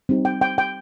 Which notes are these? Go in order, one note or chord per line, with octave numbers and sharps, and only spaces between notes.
G3 C4 D#4 G4
G5
G5
G5